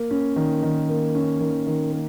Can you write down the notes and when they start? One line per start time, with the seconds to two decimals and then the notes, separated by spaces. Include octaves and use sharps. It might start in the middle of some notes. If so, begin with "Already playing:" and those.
Already playing: A#3
0.11 C#4
0.36 D#3
0.63 D#3
0.89 A#3
1.15 C#4
1.40 D#3
1.67 D#3
1.92 A#3